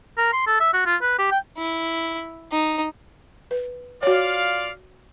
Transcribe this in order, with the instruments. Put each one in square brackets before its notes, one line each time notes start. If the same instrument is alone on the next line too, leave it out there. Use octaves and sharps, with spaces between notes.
[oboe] A#4
C6
A4
E5
F#4
F4
B4
G4
G5
[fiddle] E4
D#4
[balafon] B4
[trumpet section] F4 D5 F5 [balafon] F#4 C#5